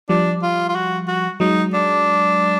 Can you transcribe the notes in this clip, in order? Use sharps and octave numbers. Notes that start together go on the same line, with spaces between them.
F3 G3 D4
F4
F4
F#4
F#4
F#3 G#3 D#4
D4